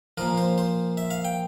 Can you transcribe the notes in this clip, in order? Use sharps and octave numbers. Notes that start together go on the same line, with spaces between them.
A#2 F3 A#4
C5
C5
E5
F5
G5